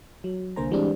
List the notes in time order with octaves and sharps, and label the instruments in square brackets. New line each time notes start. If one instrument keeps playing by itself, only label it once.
[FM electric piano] F#3
C2 D3 A#3 C5 G#5 A#5
E3 G3 G#3 C4 D4